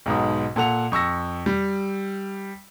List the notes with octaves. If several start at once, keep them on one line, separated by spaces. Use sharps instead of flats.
B1 G#2 B2
A#2 A4 F#5 F7
F2 C#6 E6 A#6
G3